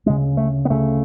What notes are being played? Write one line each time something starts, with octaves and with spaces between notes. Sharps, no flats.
D2 C#3 G#3
A3
B3
D2 C#3 A3